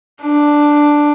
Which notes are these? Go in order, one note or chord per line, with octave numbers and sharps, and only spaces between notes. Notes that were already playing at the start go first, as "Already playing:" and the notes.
D4